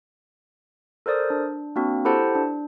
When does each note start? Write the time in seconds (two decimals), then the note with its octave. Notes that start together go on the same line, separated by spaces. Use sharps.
1.06 A4 A#4 C5 D5 D#6
1.30 D4
1.76 A#3 C4 D4 F#4
2.05 E4 G4 A4 C5 F#5 A5
2.35 D4